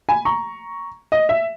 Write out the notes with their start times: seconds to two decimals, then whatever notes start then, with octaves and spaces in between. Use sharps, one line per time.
0.09 G#5 B5
0.25 A#5 C#6
1.12 D#5
1.29 E5